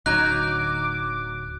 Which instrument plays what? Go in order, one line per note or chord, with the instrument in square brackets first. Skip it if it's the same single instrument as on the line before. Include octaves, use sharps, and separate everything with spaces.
[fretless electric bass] D1 D2 [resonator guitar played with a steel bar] F#3 D#4 [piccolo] D6 [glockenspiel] F#6